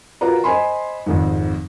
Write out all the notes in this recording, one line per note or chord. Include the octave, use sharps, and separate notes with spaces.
F4 F#4 A#4 B4 D5 A#5
C5 D#5 G#5 B5 C6
G#1 F2 G#2